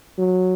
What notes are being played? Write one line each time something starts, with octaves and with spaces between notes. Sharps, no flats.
F#3